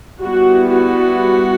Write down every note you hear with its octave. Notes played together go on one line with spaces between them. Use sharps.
G3 B3 E4 F#4
F#4